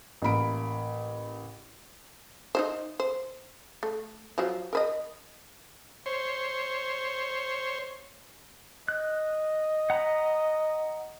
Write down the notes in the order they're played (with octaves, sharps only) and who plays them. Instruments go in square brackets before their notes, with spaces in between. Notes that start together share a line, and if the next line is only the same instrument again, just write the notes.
[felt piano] A1 A#3 B5 D7
[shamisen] D#4 F4 C5
C5
A3
F3 F#3
A#4 B4 D#5
[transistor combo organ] C5 C#5
[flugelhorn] D#5 [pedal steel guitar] F#6
[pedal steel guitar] F#5 A#5 B5